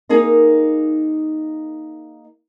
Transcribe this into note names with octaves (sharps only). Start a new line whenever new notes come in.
A#3 D#4 G#4 A#4 D#5